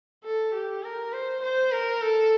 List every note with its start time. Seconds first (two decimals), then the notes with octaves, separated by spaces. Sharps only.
0.24 A4
0.54 G4
0.84 A#4
1.13 C5
1.42 C5
1.72 A#4
2.01 A4